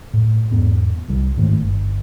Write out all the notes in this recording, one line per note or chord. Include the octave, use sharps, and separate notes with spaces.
A2
E2 G#2 B3
C2 G3
G#2 D#3 G#3 A3
G1